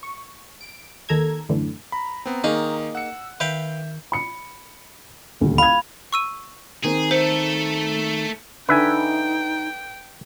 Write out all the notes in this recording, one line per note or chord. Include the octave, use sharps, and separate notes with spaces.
C#6
D7
D#2 D#3 A4 A#5 E6 G#6
F#2 A2 D3 E3
A#5 B5
B3 C4
D#3 A#3 D#4 G#4
F#5 E6 C#7
D#3 B4 E5 F5 G5 G6
B5 C#7
D#1 D2
F5 B5 G#6
C#6 E6 D#7
D#3 C4 G#4
A3 A4 C5
D3 D#4 B4 E5 G5 G#5